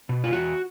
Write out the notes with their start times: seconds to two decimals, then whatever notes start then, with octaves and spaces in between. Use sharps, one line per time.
0.09 B2
0.24 F4
0.33 E2 F#4